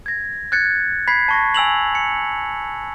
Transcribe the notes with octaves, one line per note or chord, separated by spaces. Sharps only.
G#6 A#6
F#6 G#6 A6 C#7
B5 G#6 B6 C7
A5 C#6 A#6
G#5 E6 F7 F#7
C#7